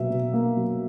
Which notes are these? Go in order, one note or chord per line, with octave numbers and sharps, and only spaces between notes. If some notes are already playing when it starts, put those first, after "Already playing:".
Already playing: B2 F#3 A#3 E5
B2
A#3
F#3